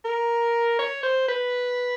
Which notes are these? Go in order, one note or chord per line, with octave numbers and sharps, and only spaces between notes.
A#4
C#5
C5
B4